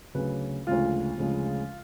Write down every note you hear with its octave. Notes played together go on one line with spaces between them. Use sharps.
D2 C#3 F#3 B4
D2 C#3 F3 G#3 F4
D2 C#3 F3 G#3